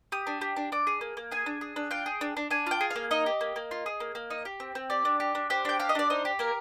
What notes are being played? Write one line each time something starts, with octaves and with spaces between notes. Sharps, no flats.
G4 D#6
D4
G4
D4
D4 D6
G#4
A#3
A#3
G#4 G#5
D4
G#4
D4
F4 G5
G#4
D4
D4
D4 G#5
F4 G5
G#4
F5
A#3
D#4 D#5
G4
A#3
A#3
F4
G#4
A#3
A#3
D#4
G4
C4
C4
G4 D5
D4
G4
D4
G4 C5
D4 G5
G4 F5
D#5
D4 D5
D#4 C5
G4
A#3 A#4